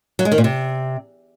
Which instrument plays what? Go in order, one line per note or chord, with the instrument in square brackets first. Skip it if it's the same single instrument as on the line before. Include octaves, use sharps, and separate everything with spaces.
[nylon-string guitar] F#3
G#3
D#3
A#2
C3